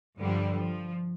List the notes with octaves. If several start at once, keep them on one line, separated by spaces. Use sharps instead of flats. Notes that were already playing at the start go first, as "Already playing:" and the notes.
G2 D3 F3 G3
F3